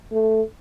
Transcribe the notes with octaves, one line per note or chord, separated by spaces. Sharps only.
A3